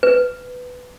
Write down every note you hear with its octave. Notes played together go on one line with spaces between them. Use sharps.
B4